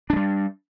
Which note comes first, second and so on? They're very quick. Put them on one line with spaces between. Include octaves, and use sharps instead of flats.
D4 G#3 G3